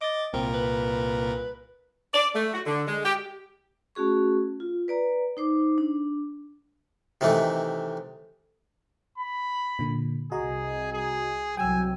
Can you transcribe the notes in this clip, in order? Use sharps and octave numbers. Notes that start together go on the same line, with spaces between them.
D#5 D6 A6
C2 A#2 C4 A#4
B4
D5
A3
F#4
D3
G#3
G4
A3 C#4 F#4 G#4 C#6
F4
B4 D5 A#5
D#4 C5 D6
D4
C3 D#3 E3 A3
B5
A#2 D3
C2 F#4 G#4 D#5 A#5
G#4
C2 F#3 G5 G#5 E6